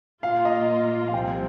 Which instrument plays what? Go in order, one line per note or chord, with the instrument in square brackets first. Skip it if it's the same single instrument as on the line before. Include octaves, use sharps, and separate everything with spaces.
[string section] A#2 A#3 F4 [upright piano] F5
[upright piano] D#5
F5
[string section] C2 C3 F3 [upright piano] G5